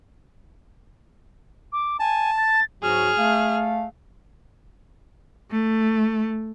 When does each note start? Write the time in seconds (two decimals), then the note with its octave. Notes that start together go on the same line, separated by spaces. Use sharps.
1.72 D6
2.00 G#5 A5
2.37 A6
2.83 G#2 F#3 F#4 G#4 F6
3.18 A3 F5
5.51 A3